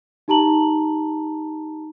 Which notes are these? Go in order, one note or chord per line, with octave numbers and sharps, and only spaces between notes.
D#4 G4 A5 A#5 F#7